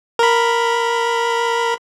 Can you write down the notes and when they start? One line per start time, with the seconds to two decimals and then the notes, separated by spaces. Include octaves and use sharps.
0.19 A#4 B5